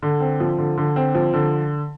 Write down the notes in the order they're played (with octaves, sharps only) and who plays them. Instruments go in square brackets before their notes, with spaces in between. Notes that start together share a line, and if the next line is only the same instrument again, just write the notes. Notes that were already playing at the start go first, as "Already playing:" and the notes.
[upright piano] D3
C4
F3
D3
D3
C4
F3
D3